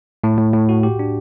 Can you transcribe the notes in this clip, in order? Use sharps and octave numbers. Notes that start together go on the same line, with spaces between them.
A2
A2
A2
F#4
G4
D4